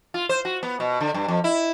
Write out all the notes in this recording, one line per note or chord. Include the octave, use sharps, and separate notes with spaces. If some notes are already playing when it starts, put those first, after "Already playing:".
F4
C5
F#4
B3
B2
D3
G2
F2
E4